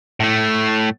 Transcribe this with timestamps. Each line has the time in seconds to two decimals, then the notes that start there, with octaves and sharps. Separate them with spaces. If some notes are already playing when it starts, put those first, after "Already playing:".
0.20 A2 A3